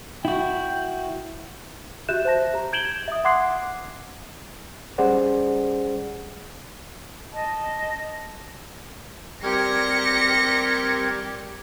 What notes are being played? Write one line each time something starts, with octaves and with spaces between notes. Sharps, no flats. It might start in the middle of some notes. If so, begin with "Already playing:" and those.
E4 F#4 G5
F#4 G4 E5 F#6 G6 E7
C5 E5 A5 A#6
G4 A#5
G6 G#6 D7 E7 F#7 G7
E5 D#6
F#5 C6 D6 F#6 G#6 C7
G3 C#4 G#4 C5 D5 F#5
D#5 A5
G3 C4 G4 A#4 G#6 A#6 C#7